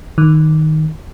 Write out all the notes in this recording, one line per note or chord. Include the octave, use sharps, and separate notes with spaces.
D#3